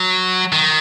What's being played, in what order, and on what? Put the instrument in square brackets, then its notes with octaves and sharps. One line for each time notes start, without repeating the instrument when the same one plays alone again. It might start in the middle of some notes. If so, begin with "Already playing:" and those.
Already playing: [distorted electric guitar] F#3
D#3